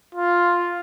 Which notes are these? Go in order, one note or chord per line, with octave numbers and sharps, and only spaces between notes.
F4